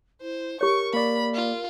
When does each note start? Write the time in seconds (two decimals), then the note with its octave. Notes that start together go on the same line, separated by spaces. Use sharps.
0.21 E4 C5
0.61 G4 A#4 C#5 C#6
0.93 A#3 D5 B5
1.34 F4